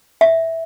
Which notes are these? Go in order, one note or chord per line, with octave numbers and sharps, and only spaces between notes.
E5